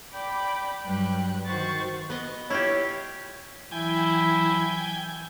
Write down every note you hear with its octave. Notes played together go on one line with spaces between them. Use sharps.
D5 G5 B5 D6
G2 F#3 G3 B4 G5 F#6
D#3 F#4 C5 C#6 A6
B3 D#5
E4 F4 G4 C#5
E3 F#3 E4 G5 G#5